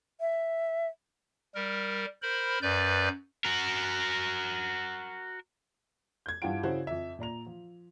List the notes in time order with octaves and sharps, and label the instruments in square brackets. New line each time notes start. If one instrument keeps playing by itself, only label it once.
[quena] E5
[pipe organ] G3 A#4
A#4 C5 B5
F#2 B4 D5 G6
[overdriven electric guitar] F#4 A#4
[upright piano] G6 G#6
G2 E4 F4 F#5 G5 D7
C#3 E4 F#4 C5
F2 E5
A#2 D5 A#5 F7
F3